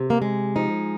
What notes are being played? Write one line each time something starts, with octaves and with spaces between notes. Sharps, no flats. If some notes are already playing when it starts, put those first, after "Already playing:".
Already playing: C3
A#3
G#3
F3 D#4